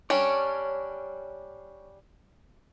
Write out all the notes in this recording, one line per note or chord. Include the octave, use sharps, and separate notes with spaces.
G3 C#4 D4 C#5